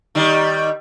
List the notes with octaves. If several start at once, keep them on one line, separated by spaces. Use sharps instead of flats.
D#3 G3